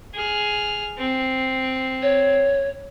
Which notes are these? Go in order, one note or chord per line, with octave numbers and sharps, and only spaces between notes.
G#4 F6
C4
C#5